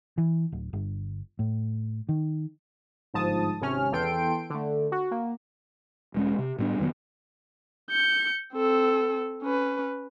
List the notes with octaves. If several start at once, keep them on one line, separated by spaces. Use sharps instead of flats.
E3
D1
G1
A2
D#3
G1 G#2 F3 A5 D#6
G#1 C3 C#4 F6
E2 E3 A4 G5 C6 D7
D3 A3
F#4
A#3
E1 G#3 C#4
C3
A2 G3 B3 D4
F1 D#3 F#3 B3
G6 C#7
C4 A4
C#4 B4